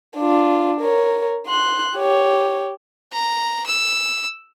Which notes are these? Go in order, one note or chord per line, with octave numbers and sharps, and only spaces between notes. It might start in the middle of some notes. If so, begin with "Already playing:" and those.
D4 F4
A#4 C#5
C6 F#6
G4 C#5
A#5
E6